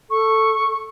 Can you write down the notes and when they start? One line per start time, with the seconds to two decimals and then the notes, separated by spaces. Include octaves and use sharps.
0.10 A4 C#6